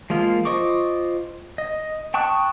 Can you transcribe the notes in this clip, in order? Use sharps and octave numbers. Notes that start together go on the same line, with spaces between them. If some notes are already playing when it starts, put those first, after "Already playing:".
F3 G#3 A#3 F4
F4 C5 D#5 C#6 D6
D#5
G5 A5 C#6 D#6 F#6